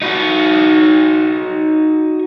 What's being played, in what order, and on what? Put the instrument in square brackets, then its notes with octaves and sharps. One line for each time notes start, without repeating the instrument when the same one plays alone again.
[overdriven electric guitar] D#4 F#4